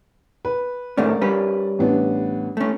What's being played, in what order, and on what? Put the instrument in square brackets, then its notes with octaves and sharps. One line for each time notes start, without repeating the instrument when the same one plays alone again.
[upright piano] B4
[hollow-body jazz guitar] G#2 A3 C#4 [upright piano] A#4 D5
[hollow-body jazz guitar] G3 C#4 B4
[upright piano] A1 B3 D4
[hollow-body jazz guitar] A3 C#4